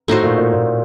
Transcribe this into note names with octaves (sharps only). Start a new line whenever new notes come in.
A2 A3 D#4 F#4 C5
A#2
A#2
A#2